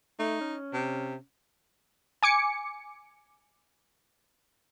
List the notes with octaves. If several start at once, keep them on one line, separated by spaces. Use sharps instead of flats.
A3 D#4
C#4
C3
G#5 D6 C#7